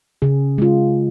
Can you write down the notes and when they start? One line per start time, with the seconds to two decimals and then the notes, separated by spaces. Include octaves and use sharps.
0.22 C#3 G#4
0.58 G#3 F4